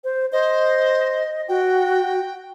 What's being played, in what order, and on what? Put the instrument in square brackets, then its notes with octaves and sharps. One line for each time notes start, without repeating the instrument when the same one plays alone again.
[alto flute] C5
[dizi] C5 [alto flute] D#5
[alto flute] F#4 [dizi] G5